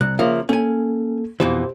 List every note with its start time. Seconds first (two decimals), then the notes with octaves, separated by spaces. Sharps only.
0.01 C2 F#6
0.19 C#3 F3 A#3 E5
0.49 A#3 C#4 A4 G#5
1.40 F2 B2 E3 G4 C5